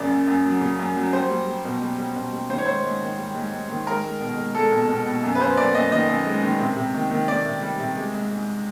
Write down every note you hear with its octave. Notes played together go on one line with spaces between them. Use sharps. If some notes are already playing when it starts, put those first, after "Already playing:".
Already playing: F#2 C#3 D5
F#2
F#2
F#3
C#3
F#2
F#3
G3 C5
G3
G3
B2
G3
G3
B2
G3
D#3 C5
C#5
G#2 C5
G#2
D#3
G3
G#2
G#2
D#3
G#3 A#4
G#3
B2
G#3
G#3 A4
B2
B2
B2
F#2
B4
F#2 C5
F#2 D5
F#2 D#5
D#3 D#5
F#2
G#3
D#3
C3
C3
D#3
D#3
D#3 D5
C3
G3
C3
G#3
G#2
G#2